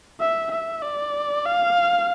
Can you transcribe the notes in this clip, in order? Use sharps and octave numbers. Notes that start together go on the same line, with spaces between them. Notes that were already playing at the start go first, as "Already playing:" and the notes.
E5
E5
D5
F5